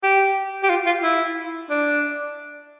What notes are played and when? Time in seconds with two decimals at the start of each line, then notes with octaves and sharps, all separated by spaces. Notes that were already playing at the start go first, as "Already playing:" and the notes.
0.03 G4
0.63 G4
0.70 F4
0.86 F4
1.03 E4
1.70 D4